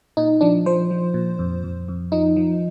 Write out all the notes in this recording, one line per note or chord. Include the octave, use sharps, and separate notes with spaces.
A#2 D#4
F3 D4
F3 C5
F3
A#2
F2
F2
F2
F3 D#4
F3